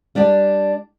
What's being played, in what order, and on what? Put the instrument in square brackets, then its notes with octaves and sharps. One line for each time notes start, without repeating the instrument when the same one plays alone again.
[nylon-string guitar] G3 D4 G4 D5